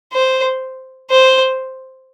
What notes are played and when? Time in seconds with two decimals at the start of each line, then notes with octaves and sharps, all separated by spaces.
0.13 C5
1.10 C5